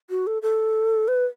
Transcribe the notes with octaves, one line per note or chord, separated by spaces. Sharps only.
F#4
A4
A4
B4